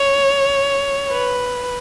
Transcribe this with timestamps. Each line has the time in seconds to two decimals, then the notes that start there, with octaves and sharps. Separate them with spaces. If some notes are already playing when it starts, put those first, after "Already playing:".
Already playing: C#5
1.10 B4